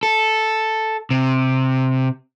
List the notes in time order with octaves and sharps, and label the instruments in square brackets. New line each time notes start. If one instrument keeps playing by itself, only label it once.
[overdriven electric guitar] A4
C3